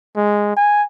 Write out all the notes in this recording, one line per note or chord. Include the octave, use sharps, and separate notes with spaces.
G#3
G#5